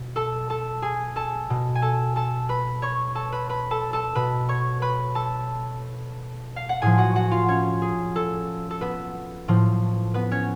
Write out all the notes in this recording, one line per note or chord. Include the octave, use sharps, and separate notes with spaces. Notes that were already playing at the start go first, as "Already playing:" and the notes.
Already playing: B2
A4 A5
A4 A5
G#4 G#5
A4 A5
B2
G#5
A4 A5
A4 A5
B4 B5
C#5 C#6
A4 A5
B4 B5
B4 B5
A4 A5
A4 A5
B2 B4 B5
C#5 C#6
B4 B5
A4 A5
F5
F#5
A2 F3 G#4 G#5
F#4 F#5
F#4 F#5
F4 F5
C#4 C#5
G#4
A4
A4
B3 B4
A2 F3
B3 B4
C#4 C#5